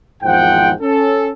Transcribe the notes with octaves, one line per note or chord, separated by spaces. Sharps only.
G#1 E2 G#2 F3 F#5 G5
C#4 A4